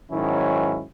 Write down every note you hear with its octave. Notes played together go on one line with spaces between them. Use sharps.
G#2 D#3 F#3 C#4 E4